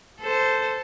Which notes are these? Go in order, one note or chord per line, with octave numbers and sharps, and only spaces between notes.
A4 C5